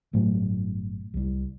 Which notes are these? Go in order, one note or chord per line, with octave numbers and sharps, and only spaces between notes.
G1 A2 F#3 A3
C2 G3